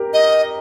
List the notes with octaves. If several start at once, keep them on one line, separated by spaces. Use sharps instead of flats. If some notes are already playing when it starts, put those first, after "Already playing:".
Already playing: G4 A#4
D#5